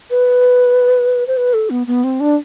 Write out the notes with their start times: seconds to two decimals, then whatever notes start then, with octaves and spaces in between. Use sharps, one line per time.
0.10 B4
1.28 C5
1.37 B4
1.54 A4
1.70 B3
1.87 B3
2.04 C4
2.20 D4